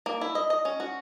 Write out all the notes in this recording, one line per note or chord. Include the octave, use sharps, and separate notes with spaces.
A#3
E4
D#5
D#5
C#4
F#4